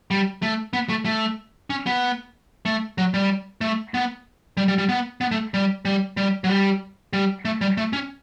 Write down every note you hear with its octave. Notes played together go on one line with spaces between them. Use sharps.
G3
A3
B3
A3
A3
C#4
B3
A3
F#3
G3
A3
B3
G3
G3
G3
B3
B3
A3
G3
G3
G3
F#3
G3
G3
A3
G3
A3
C#4